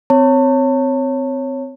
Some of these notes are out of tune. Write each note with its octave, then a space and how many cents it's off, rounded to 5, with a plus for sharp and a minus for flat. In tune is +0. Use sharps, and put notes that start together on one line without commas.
C4 -20 C#5 -10 A5 +35